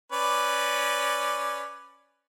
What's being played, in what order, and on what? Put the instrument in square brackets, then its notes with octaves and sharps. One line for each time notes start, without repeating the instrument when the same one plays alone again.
[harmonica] C#4 B4 D5